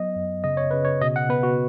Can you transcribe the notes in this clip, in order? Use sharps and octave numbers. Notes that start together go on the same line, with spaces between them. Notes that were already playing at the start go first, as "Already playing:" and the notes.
Already playing: F#3 B3 D#5
F#2
C#3 D#5
C#5
C#3 B4
C#5
B2 D#5
F#5
B3 B4
F#4